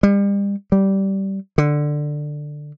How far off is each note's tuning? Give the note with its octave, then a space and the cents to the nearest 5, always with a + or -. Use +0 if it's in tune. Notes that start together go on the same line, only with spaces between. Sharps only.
G3 +35
G3 -15
D3 +10